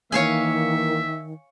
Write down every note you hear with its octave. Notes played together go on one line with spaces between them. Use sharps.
D#3 E3 A#3 C#5 E5 F5 G#5